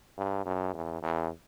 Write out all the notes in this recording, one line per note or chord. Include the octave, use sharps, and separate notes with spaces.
G2
F#2
E2
E2